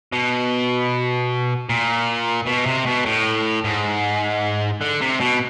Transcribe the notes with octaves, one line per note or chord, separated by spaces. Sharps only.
B2
A#2
B2
C3
B2
A2
G#2
D3
C3
B2